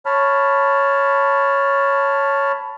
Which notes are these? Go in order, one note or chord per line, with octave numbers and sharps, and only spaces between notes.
C#5 A5 B5 F6